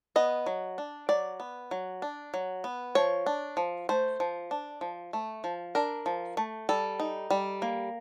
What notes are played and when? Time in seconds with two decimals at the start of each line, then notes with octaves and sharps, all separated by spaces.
0.16 B3 D#5
0.46 F#3
0.78 D4
1.09 F#3 D5
1.40 B3
1.71 F#3
2.02 D4
2.34 F#3
2.64 B3
2.95 F3 C#5
3.26 D4
3.57 F3
3.89 A3 C5
4.20 F3
4.51 D4
4.81 F3
5.13 A3
5.44 F3
5.75 D4 A#4
6.06 F3
6.37 A3
6.69 G3 A4
7.00 D#4
7.30 G3
7.62 A#3